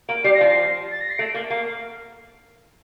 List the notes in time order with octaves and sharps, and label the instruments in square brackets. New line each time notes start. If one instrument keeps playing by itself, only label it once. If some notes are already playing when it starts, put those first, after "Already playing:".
[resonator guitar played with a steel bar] A#3 [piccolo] D7
[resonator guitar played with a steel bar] G3 [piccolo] C7
[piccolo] A#6
[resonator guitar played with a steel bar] F3 [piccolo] C7
[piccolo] A6
A#6
C7
[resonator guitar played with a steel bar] A3 [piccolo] D7
[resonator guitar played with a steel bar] A#3
[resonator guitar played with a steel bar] A#3 [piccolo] C7